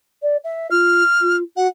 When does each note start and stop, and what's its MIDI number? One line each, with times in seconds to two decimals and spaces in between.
0.22 0.37 74
0.44 0.70 76
0.71 1.03 65
0.71 1.36 89
1.21 1.43 65
1.57 1.67 66
1.57 1.68 78